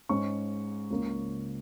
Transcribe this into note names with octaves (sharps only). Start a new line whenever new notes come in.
G#2 G#3 C#4 C#6
C#2 C#3 A#3